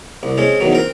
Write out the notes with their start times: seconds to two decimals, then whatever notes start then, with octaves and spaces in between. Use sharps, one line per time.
0.23 C2
0.38 G#3 C4 C#4
0.60 E2 D#3 F#3
0.73 C4 A#4